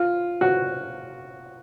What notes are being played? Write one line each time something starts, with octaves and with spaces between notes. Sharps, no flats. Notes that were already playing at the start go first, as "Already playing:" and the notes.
Already playing: F4
F#4